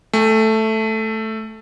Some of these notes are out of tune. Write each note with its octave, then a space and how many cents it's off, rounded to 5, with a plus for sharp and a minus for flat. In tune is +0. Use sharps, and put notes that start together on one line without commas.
A3 +0 G#5 -40